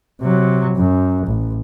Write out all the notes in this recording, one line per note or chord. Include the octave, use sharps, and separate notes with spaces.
C3 F#3
F#2
A1